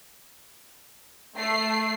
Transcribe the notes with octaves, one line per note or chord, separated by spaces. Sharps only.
A3 C7